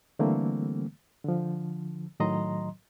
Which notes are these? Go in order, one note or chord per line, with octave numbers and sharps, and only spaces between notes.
D3 E3 G3 A3 A#3 C4
D3 F3
A2 D#3 F#3 D#5 A#5 C6